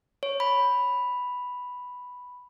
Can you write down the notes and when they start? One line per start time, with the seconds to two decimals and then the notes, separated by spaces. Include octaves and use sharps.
0.23 C#5
0.40 B5